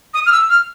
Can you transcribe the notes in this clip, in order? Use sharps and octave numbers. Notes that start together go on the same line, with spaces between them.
D#6
F6
E6
F6